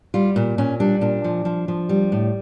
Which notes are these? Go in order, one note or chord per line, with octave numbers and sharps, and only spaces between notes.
G3 F4
A#2
A#2 C#4
G3 D4
A#2 D4
F3
F3
F3
G3
A2